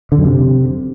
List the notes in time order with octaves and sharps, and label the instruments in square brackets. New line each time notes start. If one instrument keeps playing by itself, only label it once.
[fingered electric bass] D3
F#2
C3